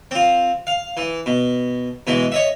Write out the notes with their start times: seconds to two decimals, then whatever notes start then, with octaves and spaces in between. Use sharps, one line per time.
0.11 C4 F4
0.67 F5
0.97 E3
1.26 B2
2.07 B2 E3 G#3
2.32 C#5 D#5 E5